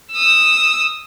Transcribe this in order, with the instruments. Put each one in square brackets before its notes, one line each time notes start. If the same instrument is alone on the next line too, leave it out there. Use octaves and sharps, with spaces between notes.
[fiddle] D#6 E6